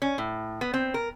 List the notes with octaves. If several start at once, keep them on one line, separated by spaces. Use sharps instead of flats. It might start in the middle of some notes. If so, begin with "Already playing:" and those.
C#4
A2
B3
C4
A#4